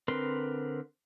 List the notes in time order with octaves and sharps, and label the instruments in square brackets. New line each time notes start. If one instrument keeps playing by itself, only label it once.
[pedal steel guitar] D3 C4 A#4 B4 C6